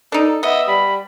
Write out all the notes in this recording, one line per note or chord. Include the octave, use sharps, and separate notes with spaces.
D4 D#4 A4
B3 D#5 E5
G3 B5